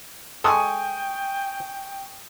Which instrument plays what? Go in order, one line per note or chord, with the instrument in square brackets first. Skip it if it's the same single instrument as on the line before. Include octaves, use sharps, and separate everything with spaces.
[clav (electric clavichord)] G#3 A4 [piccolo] G5 [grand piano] G#5 C#6 D#6